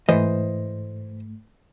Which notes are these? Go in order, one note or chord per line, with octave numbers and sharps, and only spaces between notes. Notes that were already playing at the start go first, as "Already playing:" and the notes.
G#2 E3 A3 C5 D#5